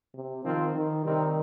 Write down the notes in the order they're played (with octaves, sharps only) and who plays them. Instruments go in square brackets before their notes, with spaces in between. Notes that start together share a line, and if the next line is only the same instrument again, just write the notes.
[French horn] C3
[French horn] D#3 [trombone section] F3 C4 F4
[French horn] D#3
[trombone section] C3 G3 C4 D#4 A#4 [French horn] D#3